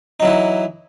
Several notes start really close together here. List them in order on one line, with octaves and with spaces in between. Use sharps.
D#4 F#3 E4 E3